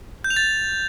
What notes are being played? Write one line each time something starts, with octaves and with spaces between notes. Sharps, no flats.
G6
F7
A6